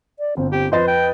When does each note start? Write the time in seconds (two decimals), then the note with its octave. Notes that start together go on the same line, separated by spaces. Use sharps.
0.19 D5
0.37 G1 C4
0.52 C4 G4
0.72 F2 B4 C5 D#5 A6
0.88 G5